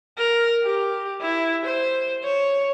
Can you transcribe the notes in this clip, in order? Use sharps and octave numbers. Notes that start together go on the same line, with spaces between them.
A#4
G4
E4
C5
C#5